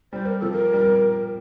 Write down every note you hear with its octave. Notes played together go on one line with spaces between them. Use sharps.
G3 C5
A#4
F3 A4
A#4
G3